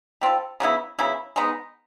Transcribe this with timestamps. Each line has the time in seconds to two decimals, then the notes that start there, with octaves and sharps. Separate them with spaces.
0.21 G3 C4 F4 A4
0.60 C#3 F#3 B3 E4
0.99 C#3 F#3 B3 E4
1.36 G#3 B3 D#4